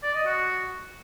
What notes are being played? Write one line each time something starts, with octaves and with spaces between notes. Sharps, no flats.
D5
D#5
F#4